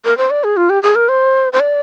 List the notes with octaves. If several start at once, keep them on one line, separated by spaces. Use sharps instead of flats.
A#4
C5
D5
G#4
F4
G4
G#4
A#4
C5
C5
D5